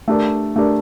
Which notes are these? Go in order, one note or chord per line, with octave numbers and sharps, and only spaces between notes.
A3 D4 G4 A#4 D5
A3 D4 G4 A#4 D5